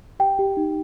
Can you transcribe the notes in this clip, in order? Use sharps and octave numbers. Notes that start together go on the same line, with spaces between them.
G4 G5
G4
D#4